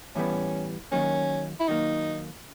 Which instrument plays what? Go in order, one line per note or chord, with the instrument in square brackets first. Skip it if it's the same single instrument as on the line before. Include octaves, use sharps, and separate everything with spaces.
[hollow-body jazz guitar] A2 E3 G3 B3 [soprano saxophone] C#4
[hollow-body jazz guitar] D#3 F#3 A#3 [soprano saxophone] C#4
[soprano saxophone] E4
[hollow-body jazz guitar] D#3 F#3 A#3 [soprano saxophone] D#4